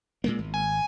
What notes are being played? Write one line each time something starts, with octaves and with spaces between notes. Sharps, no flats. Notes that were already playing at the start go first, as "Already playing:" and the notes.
A#2 G#3 A#3
G#1
G#5